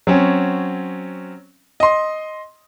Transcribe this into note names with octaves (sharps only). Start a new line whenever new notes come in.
F#3 C4 C#4
D#5 C6